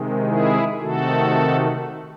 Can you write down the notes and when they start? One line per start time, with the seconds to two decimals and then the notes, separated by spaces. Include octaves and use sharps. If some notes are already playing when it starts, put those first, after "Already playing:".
Already playing: C3 D#3 G#3
0.26 E4 G#4
0.80 C3 D#3 A3 F#4 A4